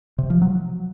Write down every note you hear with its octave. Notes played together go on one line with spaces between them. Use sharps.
C3
F3
F#3